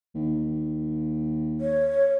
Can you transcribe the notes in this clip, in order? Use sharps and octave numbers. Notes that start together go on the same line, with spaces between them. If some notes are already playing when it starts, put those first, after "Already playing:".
D#2
C#5